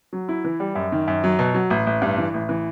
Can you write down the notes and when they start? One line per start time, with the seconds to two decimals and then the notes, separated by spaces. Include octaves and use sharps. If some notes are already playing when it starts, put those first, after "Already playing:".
0.13 F#3
0.29 E4
0.44 E3
0.60 G3
0.75 F#2
0.92 D#3
1.08 F#2
1.24 F#3
1.39 B2
1.54 F#3
1.70 A1
1.87 A1
2.02 G2
2.18 E3
2.34 A1
2.49 E3